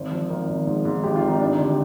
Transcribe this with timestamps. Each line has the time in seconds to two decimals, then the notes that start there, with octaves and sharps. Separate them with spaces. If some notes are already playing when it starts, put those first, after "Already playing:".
Already playing: G#1 C5
0.12 F3
0.30 G#1 A#4
0.48 G#1
0.67 G#2
0.85 G#2
1.04 G#1 G4
1.16 F4
1.22 G#1
1.28 D#4
1.40 G3 D4
1.52 D#4
1.58 D2
1.64 G4